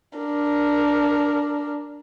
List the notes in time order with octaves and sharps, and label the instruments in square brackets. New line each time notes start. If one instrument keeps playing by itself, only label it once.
[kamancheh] D4 A#4